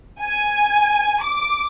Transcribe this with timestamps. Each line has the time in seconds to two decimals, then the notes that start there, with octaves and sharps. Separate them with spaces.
0.21 G#5
1.22 D6